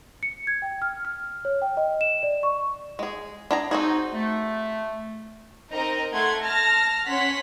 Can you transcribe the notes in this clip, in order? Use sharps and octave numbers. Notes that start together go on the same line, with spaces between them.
C#7
G#6
G5
F6
F6
C#5
G5
D#5
E7
D5
C#6
G#3 G#4
D4 G#4 A#5
C4 D#4 F#4 G#4
A3
C4 D#4 A#4 D#5 A#5
A3 F#5 C6 G#6
A5 F6 A#6
C#4 C#5 F#5 C6 B6